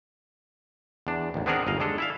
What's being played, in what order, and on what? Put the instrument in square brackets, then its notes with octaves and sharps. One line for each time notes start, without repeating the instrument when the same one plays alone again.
[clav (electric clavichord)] E2 D4
A1 D#2
B3 C4 D4 G#4 A#4 F#5
G1 D#2 D#5 F5
G#3 D4 A4
E4 E5 F5